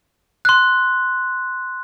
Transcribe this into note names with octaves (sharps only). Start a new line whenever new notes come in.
C6 F#6